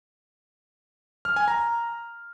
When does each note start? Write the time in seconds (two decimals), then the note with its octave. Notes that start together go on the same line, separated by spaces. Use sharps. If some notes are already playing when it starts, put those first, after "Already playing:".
1.25 F6
1.36 G#5
1.48 A#5